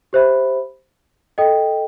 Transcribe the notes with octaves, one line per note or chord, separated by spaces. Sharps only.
G4 C5 E5 B5
A4 D#5 G5